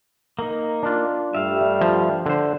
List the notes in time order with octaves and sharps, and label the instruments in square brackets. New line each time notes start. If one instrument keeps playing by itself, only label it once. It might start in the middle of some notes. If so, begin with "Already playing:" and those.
[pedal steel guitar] A#3 D#4
[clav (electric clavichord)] D4 F4
[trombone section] G2 G3 A3 [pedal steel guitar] E5 F5
[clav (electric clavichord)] F3
D3 C5